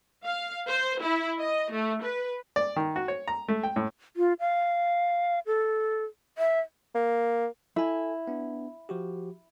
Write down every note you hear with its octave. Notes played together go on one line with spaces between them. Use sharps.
F5
C5
E4
D#5
A3
B4
D5
D#3
F#4
C#5
A#5
A3
G5
A2
F4
F5
A4
E5
A#3
E4 A4 G#5
B3 D4
F3 F#4 G4